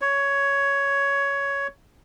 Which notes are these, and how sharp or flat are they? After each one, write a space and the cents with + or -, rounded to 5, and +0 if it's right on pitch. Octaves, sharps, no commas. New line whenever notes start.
C#5 +10